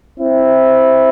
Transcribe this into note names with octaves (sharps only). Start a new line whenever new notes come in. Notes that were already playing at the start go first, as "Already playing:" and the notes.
C4 E4